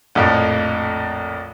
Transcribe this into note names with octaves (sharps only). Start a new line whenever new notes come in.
A#1 F2 A2